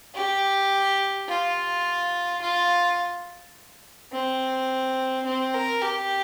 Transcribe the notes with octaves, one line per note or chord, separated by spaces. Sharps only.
G4
F4
F4
C4
C4
A#4
G4